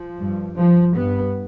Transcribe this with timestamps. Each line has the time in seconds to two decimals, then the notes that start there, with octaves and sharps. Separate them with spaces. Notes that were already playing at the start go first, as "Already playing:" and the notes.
Already playing: F3
0.18 G2
0.57 F3
0.95 G2 B3